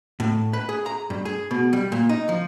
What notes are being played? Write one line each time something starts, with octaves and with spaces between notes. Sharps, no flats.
A2
B4
G#4
A#5
G2
G#4
B2
G3
A#2
D#4
F3